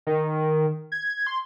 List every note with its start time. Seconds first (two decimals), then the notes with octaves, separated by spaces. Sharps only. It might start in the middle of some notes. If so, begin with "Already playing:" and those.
0.07 D#3
0.92 G#6
1.27 C6